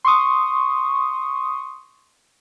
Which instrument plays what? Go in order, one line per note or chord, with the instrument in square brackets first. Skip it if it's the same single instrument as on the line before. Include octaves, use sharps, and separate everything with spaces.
[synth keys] C6 C#6 D#6